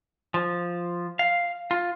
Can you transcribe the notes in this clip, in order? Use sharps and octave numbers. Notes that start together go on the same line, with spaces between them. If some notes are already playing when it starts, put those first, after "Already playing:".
F3
F5
F4